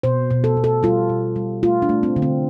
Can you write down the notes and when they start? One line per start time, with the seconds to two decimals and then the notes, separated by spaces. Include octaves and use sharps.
0.03 B2 C5
0.31 B2
0.44 A4
0.57 B2
0.64 A4
0.83 G3 F4
1.09 B2
1.36 G3
1.63 A3 F4
1.82 D4
1.89 A3
2.03 C4
2.16 D3
2.22 C4